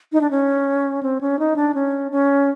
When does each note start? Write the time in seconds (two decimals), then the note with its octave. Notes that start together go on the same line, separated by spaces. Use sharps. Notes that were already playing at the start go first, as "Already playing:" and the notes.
0.12 D#4
0.21 D4
0.31 C#4
1.03 C4
1.21 C#4
1.39 D#4
1.56 D4
1.75 C#4
2.12 C#4